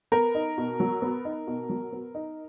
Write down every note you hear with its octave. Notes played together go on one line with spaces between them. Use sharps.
B3 A#4
D#4
B2
F#3
B3
D#4
B2
F#3
B3
D#4